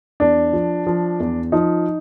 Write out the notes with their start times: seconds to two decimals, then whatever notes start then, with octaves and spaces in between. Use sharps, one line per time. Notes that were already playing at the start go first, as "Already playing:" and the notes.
0.20 E2 D4
0.53 F3
0.87 F3
1.20 E2
1.52 F3 D#4